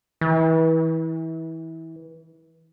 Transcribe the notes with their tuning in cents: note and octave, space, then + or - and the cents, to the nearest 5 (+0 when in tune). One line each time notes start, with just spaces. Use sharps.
E3 -25